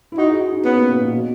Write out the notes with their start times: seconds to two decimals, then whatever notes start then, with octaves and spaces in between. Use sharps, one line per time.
0.12 E4
0.18 D#4 F#4
0.30 G#4
0.41 F#4
0.53 D#4
0.65 B3 C#4
0.77 A#3
0.89 B2
1.00 A#2
1.12 B2